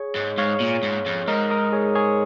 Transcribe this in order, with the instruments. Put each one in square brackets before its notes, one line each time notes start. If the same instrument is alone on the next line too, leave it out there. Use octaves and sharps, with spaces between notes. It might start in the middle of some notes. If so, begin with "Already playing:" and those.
Already playing: [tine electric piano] G#4 C#5
[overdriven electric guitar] G#2
[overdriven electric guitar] G#2 [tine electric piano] C#5 F5
[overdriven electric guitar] A#2
G#2
F2
[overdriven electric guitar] G#2 [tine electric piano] A#4 D#5
[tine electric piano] A#4 D#5
G#4 C#5
G#4 C#5